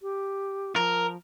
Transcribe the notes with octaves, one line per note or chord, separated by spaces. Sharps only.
G4
F3 A#4